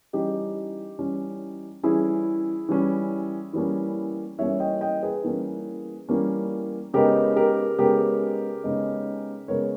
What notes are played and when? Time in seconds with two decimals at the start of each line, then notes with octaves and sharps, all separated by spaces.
0.13 E3 G3 C#4 D#4 G4
0.99 E3 G3 C#4
1.83 E3 G3 C#4 E4 G#4
2.69 E3 G3 C#4
3.53 E3 G3 A#3 C#4
4.38 E3 G3 A#3 C#4 C#5 E5
4.60 D#5 G5
4.81 D#5 G5
5.03 G#4 B4
5.24 E3 G3 A#3 C#4
6.09 E3 G3 A#3 C#4
6.94 C#3 G#3 B3 D#4 G4 A#4
7.36 G4 A#4
7.79 C#3 G#3 B3 D#4 G4 A#4
8.64 C#3 G#3 B3 D#4
9.48 C#3 G#3 B3 D#4 A#4 C#5